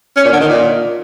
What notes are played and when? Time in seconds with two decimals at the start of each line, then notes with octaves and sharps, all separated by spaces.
0.17 C#4
0.25 A#2
0.33 D3
0.41 D#3
0.49 A#2